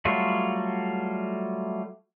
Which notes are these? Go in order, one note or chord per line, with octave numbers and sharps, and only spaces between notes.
F#3 G3 A3 F4 F#4